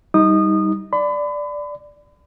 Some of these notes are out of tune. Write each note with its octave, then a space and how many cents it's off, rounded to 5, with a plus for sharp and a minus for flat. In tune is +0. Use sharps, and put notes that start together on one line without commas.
G3 +0 D#4 +20 D#6 -25
D5 +0 B5 +35